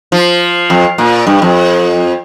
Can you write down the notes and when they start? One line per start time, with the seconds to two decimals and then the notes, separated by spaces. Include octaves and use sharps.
0.12 F3
0.70 F2
0.98 A#2
1.27 G2
1.42 F2